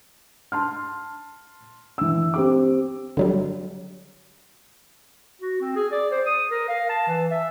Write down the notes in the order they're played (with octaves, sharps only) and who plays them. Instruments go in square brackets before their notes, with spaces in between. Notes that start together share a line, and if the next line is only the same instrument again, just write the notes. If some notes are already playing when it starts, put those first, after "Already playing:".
[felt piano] A5 C6 F6
E3 E6
C4 G4 D6
[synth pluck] D3 F#3 G3
[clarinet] F#4
C4
G#4
D5
C5
D#6
A#4
F5
A5
E3
E5